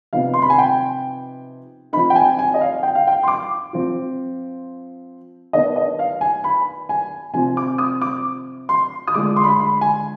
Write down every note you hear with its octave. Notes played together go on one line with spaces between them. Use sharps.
C3 F3 B3 D#4 F5
C6
B5
G#5
G5
F3 C4 D#4 B5
G5
G#5
G#5
D#5
F5
G5
F5
G5
C6
D6
F3 C4 F4
D#3 B3 D4 D#5
D#5
F5
G#5
B5
G#5
C3 F3 C4 G#5
D6
D#6
D6
C6
D#6
D3 G#3 D4 F4 D6
C6
B5
C6
B5
G#5